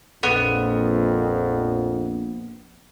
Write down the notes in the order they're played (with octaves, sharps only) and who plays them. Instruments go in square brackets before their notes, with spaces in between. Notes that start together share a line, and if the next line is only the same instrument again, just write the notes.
[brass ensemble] A#1 [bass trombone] F2 [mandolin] B3